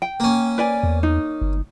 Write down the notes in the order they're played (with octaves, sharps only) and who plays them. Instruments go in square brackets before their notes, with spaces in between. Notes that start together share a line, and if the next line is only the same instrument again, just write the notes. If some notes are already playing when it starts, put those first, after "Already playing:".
[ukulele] G5
[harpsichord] A#3 C#4
[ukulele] B4 D5 G#5
[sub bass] E2
[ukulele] D#4
[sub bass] G1